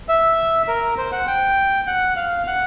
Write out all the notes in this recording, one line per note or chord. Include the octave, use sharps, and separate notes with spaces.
E5
A#4
C5
F#5
G5
F#5
F5
F#5